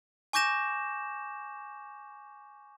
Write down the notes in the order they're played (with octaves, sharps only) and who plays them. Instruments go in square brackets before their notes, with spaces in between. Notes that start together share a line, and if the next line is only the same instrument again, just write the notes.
[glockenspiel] G#5 C#6 D6 G6 A#6 E7